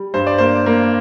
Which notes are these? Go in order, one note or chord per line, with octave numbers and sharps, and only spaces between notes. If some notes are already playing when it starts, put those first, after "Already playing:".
Already playing: G3
G2 C5
D5
A#3 C5
A#3